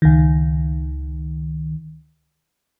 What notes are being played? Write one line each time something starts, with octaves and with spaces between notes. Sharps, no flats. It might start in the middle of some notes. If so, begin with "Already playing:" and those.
C#2 D#3